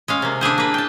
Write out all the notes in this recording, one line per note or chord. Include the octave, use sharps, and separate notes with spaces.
G#3 C#4 F5
C3 A#3
D4 E4 G#4 C5
A#3 B4
G5 A5